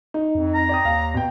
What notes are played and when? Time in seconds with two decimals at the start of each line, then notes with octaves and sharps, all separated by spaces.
0.14 D#4
0.35 F2
0.55 A#5
0.69 D5 G5 D#6
0.85 D#2 F5
1.14 B2 G5